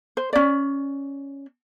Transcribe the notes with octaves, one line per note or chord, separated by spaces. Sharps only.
C5
C#4 D5